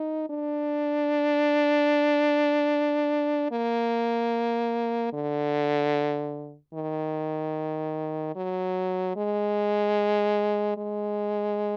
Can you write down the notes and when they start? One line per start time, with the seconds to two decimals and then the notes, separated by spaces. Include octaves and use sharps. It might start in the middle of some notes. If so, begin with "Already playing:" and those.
Already playing: D#4
0.29 D4
3.52 A#3
5.13 D3
6.74 D#3
8.36 F#3
9.16 G#3
10.77 G#3